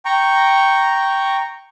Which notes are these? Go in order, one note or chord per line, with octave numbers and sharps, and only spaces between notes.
G5 A#5 C#6